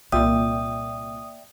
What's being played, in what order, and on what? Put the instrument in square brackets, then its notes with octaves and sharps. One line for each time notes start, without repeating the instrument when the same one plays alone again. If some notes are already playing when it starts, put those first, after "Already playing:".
[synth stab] C2 A#2 [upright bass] A#3 [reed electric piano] D5 E5 G5 [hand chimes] D#6